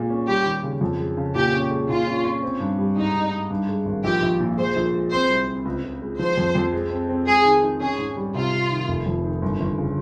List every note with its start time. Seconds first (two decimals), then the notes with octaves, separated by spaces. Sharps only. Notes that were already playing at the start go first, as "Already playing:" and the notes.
Already playing: A#2 G#3
0.10 C#4
0.27 G3 G4
0.45 D#2
0.63 C#3
0.81 F2
0.99 G#3
1.17 C#3
1.35 A#2 G4
1.53 C#4
1.71 G#3
1.88 A#2 F4
2.07 C#4
2.25 C#4
2.43 C4
2.60 G2
2.78 G3
2.97 G#2 D#4
3.14 G#2
3.32 G#2
3.50 G2
3.69 G#3
3.86 G#1
4.03 A#1 G4
4.22 A#1
4.40 A#2
4.58 G#3 C5
4.76 A#1
4.93 G#3
5.11 C4 C5
5.30 C2
5.48 C4
5.65 C#2
5.83 C#2
6.01 G#3
6.19 F3 C5
6.37 F2
6.55 F2
6.73 G#3
6.91 C4
7.09 C4
7.27 G#3 G#4
7.45 D#3
7.63 D#4
7.80 C#4 G#4
7.98 G#2
8.16 G3
8.34 C3 F4
8.52 C3
8.71 D#3
8.88 F1
9.06 F2
9.24 D#3
9.42 G1
9.60 G1
9.78 C#3